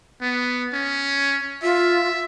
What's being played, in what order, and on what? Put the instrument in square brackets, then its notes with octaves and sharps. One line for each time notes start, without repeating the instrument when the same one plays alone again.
[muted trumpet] B3
C#4
[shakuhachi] F4 [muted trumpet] E5